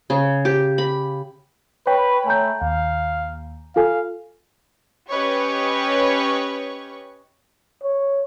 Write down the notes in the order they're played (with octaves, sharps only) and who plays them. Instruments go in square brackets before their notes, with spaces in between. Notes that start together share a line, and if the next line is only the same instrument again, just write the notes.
[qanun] C#3
G4
B5
[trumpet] B4 [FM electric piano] C#5 G5 B5
[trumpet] A3 [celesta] G#5 A#5 G6
[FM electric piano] D#2 [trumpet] F5
[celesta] F4 A4 G#5 [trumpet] F5
[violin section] C#4 G4 B4 C#5 D#5 C#6
[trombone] C#5